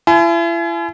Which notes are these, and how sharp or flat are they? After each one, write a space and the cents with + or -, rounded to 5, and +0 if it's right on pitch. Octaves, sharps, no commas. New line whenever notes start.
E4 +40 G#5 +35